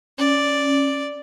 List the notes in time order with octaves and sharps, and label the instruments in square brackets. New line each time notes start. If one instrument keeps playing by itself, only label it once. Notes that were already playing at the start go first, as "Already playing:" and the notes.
[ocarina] C#4 [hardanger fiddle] D5